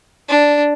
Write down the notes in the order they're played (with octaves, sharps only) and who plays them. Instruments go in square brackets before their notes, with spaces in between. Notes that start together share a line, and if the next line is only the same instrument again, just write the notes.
[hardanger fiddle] D4